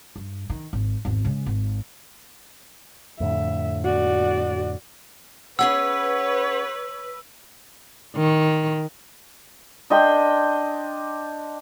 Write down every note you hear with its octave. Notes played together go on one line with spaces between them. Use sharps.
G2
D#3
G#1
G#1 E2
C#3 G#3
G#1
F2 A2 D3 E5
F#4 D5
C#4 G#4 B4 C#5 F#5 E6
D#3
D4 D#5 G5 C6